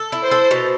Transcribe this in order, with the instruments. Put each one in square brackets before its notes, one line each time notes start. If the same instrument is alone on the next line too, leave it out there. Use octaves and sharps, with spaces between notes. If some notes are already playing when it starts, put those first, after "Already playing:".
Already playing: [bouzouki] A4
E4
[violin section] C5
[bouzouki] A4
B2